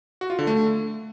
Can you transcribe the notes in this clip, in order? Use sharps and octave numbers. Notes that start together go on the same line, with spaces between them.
F#4
F4
D3
A3